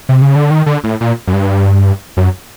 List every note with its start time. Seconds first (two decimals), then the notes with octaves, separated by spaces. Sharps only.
0.09 C3
0.22 C#3
0.36 D3
0.51 D#3
0.66 D3
0.84 A2
1.01 A#2
1.27 F#2
1.33 G2
2.17 F#2